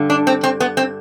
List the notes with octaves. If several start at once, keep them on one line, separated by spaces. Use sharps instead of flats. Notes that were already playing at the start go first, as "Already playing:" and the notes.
Already playing: G2 D3
D4
C4
C4
B3
C4